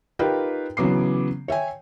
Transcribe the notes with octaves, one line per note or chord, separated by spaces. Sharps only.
D#4 F4 G4 A#4 B4 G5
C#3 E3 F#3 B3 D6 C7
C#5 E5 G5 G#5